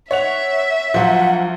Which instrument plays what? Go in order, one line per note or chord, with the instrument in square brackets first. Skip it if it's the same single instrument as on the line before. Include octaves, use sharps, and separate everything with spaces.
[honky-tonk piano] C#5 F#5 F7 [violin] E5
[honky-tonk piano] D2 [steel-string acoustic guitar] F3 F#3 [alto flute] F#5